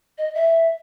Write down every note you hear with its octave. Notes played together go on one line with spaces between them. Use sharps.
D#5
E5